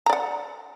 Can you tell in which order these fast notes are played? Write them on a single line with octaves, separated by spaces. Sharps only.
A#5 D5 F#5